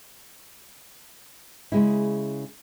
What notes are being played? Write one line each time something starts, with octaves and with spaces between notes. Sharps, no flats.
C#3 G#3 E4